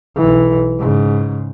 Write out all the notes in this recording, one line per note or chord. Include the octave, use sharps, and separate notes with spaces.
B1 E3
G#2 C#3